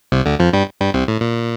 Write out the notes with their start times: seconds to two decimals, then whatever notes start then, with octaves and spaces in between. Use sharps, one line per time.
0.12 C2 C3
0.26 D2 D3
0.39 F2 F3
0.53 G2 G3
0.80 G2 G3
0.94 C2 C3
1.08 A2
1.21 A#2